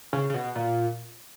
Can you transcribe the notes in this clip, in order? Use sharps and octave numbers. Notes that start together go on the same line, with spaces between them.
C#3
C#3
B2
A#2